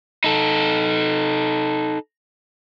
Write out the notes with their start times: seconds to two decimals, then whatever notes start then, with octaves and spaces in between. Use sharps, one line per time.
0.24 D#4 A4